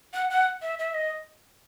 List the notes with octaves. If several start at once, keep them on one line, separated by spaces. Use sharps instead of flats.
F#5
F#5
E5
E5
D#5